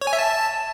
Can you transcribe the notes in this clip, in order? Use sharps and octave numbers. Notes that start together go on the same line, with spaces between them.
C#5
G#5
E5
A5